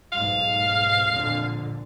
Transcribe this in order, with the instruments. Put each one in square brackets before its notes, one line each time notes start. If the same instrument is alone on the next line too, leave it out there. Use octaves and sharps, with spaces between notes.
[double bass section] B1 G#2 [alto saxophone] F5
[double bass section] F2 A#2 D3